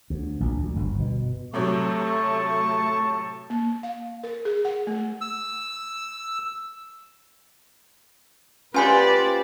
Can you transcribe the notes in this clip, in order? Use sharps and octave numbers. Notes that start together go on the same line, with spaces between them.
D2
A#1
D2
G1
B2
A2 C3 F#3 A3 A5 C#6
A#3
F5
A#4
G#4
F#5
A3
E6
C#4 F4 G4 B4 C5 D5 G#5